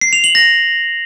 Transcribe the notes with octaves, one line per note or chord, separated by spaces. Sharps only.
C7
F7
F#7
A#6